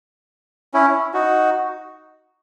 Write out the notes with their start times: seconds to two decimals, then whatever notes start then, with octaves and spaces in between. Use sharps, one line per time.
0.74 C#4 E4
1.14 D#4 F#4